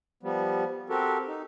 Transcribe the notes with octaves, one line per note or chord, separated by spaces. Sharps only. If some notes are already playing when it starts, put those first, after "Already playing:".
F3 G3 B3
C4 F#4 G4 A4 A#4
D#4